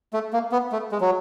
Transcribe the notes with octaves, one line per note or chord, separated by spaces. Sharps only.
A3
A#3
B3
A3
G#3
F#3